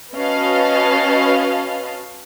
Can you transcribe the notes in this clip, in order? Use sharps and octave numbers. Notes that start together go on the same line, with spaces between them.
C#4 F#4 B4 D#5 F5 A5